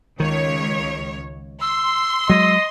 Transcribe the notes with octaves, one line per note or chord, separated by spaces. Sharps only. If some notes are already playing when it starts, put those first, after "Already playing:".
C#2 D#3 C#5
C6 E6
F#3 G#3 D#5